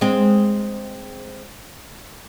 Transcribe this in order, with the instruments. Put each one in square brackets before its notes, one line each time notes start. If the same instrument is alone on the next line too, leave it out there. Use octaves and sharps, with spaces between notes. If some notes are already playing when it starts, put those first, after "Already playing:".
[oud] G#3 C4